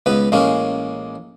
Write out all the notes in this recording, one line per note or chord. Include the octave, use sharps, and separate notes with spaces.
C#2 B3 B4
A1 G#3 A#3 C#4